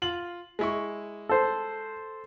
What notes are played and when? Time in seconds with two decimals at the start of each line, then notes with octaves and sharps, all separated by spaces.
0.02 F4 F#7
0.59 G#3 E4 C#6
1.29 A4 C5